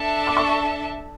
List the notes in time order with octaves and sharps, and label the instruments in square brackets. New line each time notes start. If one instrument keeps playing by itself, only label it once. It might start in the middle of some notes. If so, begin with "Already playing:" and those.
Already playing: [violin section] D4 A4 E5 A5
[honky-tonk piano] D6
C#6